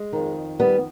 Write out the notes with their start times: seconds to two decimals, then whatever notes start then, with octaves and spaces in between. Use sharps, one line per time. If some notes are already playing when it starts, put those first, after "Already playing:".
Already playing: G#3
0.13 F2 D#3
0.60 G3 B3